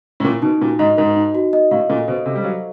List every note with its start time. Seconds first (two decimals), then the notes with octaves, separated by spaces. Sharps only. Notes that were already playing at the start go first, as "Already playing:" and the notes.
0.20 A2
0.24 A#2 A#4
0.42 B2 D#4
0.61 A#2 F#4
0.79 G#2 D#5
0.97 G#2 A#4
1.17 D#4
1.35 F#4
1.53 D#5
1.71 A2 F5
1.89 A#2 A4
2.08 B2 C5
2.25 C3 A4
2.36 G3
2.44 F#3 F5